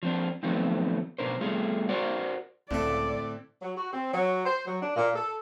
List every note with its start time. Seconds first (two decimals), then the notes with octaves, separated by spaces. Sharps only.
0.03 F3 C4 D4
0.43 D#3 F3 F#3 A3 B3 C4
1.19 B2 D4 A#4 C5
1.41 G3 A3 B3 F4 G#4
1.89 F#4 A#4 C5 D5 F#5
2.71 C#2 A2 D3 A3 C4 D5
3.61 F#3
3.76 F#4
3.91 C4
4.12 F#3
4.46 C5
4.66 F#3
4.82 D4
4.95 A#2
5.15 A4